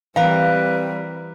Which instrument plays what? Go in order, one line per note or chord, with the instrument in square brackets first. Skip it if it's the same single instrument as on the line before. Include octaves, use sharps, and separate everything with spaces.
[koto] E3 A#4 [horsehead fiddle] G3 C4 [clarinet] B4 [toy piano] F5